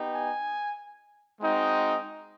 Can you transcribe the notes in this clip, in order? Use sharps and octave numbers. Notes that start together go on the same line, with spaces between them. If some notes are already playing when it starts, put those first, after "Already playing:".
Already playing: B3 D#4 G4
G#5
G#3 C4 D#4 F#4